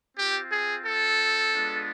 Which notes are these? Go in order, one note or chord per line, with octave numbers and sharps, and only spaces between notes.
C4 F4 G4
G#4
A4
G#3 B3 D4 F4